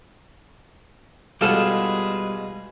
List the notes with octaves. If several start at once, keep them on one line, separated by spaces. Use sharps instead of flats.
B2 G3 G#3 F4 G#4 A4 B4 F#5